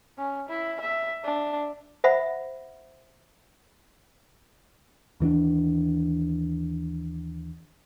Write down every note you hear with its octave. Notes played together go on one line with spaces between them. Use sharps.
C#4
E4
E5
D4
C5 E5 F#5 B5
D#2 E3 C#4 D4